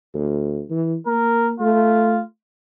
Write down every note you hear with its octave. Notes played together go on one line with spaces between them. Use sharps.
D2
E3
A#3 A#4
A3 F4